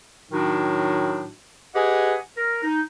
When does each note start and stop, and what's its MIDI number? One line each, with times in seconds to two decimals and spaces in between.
0.32 1.30 45
0.32 1.30 51
0.32 1.30 54
0.32 1.30 62
0.32 1.30 63
0.32 1.30 66
1.75 2.16 67
1.75 2.16 68
1.75 2.16 71
1.75 2.16 75
1.75 2.16 78
1.75 2.16 80
2.37 2.62 70
2.63 2.82 63